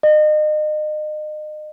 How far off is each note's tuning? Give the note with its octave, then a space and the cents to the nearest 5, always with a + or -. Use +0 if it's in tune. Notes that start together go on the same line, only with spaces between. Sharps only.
D#5 -35